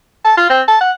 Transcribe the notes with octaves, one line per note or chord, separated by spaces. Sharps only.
A5
F4
C4
A5
F#5